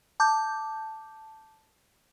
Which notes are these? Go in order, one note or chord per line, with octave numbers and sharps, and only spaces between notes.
A5 D6 G6